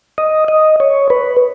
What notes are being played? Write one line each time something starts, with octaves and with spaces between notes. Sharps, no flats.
D#5
D#5
C#5
B4